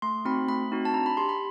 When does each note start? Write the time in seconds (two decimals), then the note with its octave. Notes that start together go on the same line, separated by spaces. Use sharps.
0.02 A3 C6
0.25 C4 D#4 F#4 B5
0.48 A3 B5
0.72 C4 D#4 F#4
0.85 A5
0.94 D4 A#5
1.06 B5
1.17 G4 C6
1.29 B5